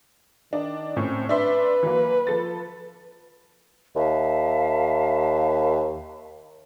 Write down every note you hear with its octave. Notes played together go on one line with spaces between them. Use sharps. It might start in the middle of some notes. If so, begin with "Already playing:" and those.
D#3 D4 D#4
A2 C4 C#4
D4 B4 E5 C6
E3 F#3 A#3
F3 A4 A6
D#2 E5 F5 A5